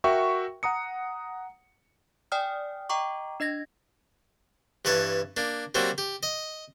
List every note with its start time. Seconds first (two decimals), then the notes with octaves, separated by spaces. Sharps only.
0.04 F#4 A#4 E5 G5 C#6
0.63 F#5 A#5 D#6 C#7
2.32 D5 G5 G#5 D#6 F6
2.89 D#5 G5 A#5 C#6 D6
3.40 D4 D#5 G#6 A#6
4.85 G2 E3 B4 C#5 A5
5.37 A#3 D4
5.75 F#3 G3 A#3 C4 F#4
5.98 G4
6.23 D#5